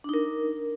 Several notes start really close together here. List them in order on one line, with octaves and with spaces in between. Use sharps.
D4 D#4 A#4